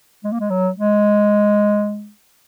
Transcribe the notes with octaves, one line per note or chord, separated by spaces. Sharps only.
G#3
A#3
G#3
F#3
G#3